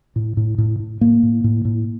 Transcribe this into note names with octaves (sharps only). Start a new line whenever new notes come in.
A2
A2
A2
A2
A2 A#3
A2
A2
A2